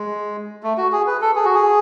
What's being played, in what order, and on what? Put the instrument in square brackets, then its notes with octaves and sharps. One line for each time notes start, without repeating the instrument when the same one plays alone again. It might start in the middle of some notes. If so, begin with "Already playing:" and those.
Already playing: [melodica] G#3
A3
F#4
G#4
B4
A4
G#4
F#4
G#4